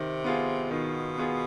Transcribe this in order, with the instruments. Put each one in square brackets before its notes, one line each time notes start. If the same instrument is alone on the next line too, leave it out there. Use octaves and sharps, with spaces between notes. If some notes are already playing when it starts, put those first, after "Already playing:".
Already playing: [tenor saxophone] C3 [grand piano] D#3
[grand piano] B3 F4 G#4
[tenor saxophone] B2 [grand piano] D#3
[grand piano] B3 F4 G#4